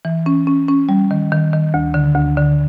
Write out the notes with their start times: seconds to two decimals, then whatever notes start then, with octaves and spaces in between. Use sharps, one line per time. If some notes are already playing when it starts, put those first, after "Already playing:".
0.05 E3
0.26 C#4
0.47 C#4
0.68 C#4
0.89 G3
1.11 D#3
1.32 D#3
1.53 D#3
1.74 D2
1.94 D3
2.15 D2
2.37 D3